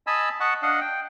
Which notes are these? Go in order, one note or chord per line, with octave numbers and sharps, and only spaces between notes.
D#5 G#5 A5 B5 E6
D#5 F#5 A5 C#6
D4 D#5 F5 F#5
G5